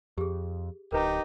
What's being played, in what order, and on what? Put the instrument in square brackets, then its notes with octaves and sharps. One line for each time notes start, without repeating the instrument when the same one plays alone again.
[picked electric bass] F2 [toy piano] G4 G#4
[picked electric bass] D1 [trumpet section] D#4 G4 [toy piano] A#4 B4 A#5